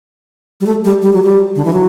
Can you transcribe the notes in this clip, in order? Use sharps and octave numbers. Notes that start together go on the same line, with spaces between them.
G3
A3
G3
G3
F#3
G3
D3
E3
F#3